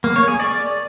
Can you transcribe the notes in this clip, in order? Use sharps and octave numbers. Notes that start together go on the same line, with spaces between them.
A#3
C#5
G#4
D5